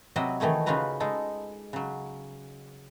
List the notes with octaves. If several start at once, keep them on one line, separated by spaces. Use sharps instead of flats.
C3 F#3 B4 D#5 E5 F#5
D#3 E3 A3 D#4 C#5
C#3 D#4 F4 F#4 B4 A#5
G#3 D#4 A4
C#3 F#3